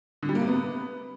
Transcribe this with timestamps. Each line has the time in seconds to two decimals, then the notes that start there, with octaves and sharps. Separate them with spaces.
0.23 D3
0.29 G3
0.35 A#3
0.41 C3
0.48 B3